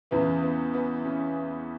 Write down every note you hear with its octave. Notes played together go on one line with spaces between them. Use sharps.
E2 C#3 E3 B3
B3
B3
C#4